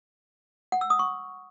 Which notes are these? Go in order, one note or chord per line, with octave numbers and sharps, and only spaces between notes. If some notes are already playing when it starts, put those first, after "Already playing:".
F#5
E6
D#6
C#6